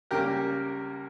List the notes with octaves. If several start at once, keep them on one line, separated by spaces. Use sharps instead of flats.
C#2 C#3 G3 A#3 G4 A#4